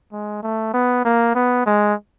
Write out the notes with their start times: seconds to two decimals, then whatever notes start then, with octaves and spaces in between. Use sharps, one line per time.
0.12 G#3
0.43 A3
0.74 B3
1.05 A#3
1.35 B3
1.66 G#3